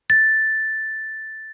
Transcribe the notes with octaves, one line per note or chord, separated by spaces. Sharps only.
A6